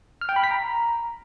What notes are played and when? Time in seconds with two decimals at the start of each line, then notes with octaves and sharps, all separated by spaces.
0.21 F6
0.29 G5
0.36 B5
0.44 B6
0.51 A#5